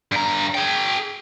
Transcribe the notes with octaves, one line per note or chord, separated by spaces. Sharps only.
G2 A#5
G#4 G5